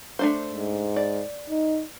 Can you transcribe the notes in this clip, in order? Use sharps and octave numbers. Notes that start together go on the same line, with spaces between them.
A3 D4 C5
G#2
D5
D#4